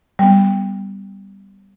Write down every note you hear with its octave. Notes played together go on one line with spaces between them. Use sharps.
G3 B3